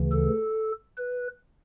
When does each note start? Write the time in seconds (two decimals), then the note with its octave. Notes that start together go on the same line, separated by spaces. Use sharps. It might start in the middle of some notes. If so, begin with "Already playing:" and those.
Already playing: D2 C#3 E3
0.12 A4
0.98 B4